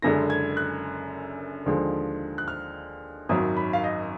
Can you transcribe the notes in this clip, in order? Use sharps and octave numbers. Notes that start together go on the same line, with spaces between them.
F#1 F#2 D3 G#3 A#6
G#6
F#6
D#2 D3 F3 G#3
F#6
F6
G#1 F#2 D#3 F#3 D#6
B5
F5
D#5